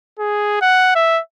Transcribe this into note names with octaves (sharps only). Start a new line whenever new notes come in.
G#4
F#5
E5